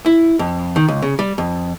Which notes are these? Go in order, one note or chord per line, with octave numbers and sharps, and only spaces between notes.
E4
F2
D#3
C#2
C#3
G3
F2